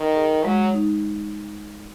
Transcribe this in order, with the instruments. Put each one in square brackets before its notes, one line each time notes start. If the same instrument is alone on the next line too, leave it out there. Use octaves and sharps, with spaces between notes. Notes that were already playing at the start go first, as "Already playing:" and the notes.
Already playing: [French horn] D#3
[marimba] G#4
[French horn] F#3 [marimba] G#3
[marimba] D#4